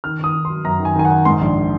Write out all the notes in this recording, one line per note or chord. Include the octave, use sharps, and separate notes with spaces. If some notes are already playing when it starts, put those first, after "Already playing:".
D#3 F6
D#3 D#6
D#3
C6
F#3
F#2 A#5
D#3
G#5
D#3 G#5
F#5
D#3
G#2 C6
A#1